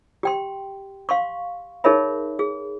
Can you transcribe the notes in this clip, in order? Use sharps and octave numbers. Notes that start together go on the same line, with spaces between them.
G4 G5 C6
F5 C6 C#6
D#4 G#4 A#4 C#5 E5 B5
G#4